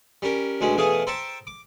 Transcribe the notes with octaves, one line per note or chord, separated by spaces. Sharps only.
G3 C#4 A#4
D2 B2 G#3 C#4 F#4
E2 B2 A3 G#4 F5 D#6
C5 E5 G5 A5 A#5 C#6
D6